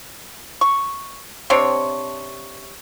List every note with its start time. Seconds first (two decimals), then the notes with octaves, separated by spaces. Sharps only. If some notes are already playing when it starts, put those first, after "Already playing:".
0.61 C#6
1.50 C3 C4 D4 C#5